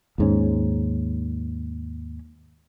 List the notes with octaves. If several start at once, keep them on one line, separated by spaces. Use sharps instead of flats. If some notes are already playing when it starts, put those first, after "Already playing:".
D#2 G#2 C#4